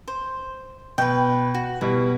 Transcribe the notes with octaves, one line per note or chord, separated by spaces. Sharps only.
C5
B2 B4 G5
F#4
B2 G3 E4